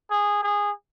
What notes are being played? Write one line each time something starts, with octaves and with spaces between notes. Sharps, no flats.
G#4
G#4